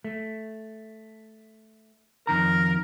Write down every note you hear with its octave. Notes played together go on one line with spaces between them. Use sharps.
A3
F2 D#3 A#4 A#5